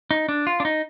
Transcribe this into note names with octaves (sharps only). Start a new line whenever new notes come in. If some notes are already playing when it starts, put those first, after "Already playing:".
D#4
D4
F4
D4
D#4